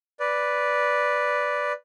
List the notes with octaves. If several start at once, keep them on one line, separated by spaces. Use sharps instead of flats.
B4 D5